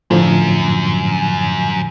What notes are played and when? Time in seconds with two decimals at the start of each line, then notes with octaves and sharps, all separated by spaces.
0.11 F#2 A2 D3 F3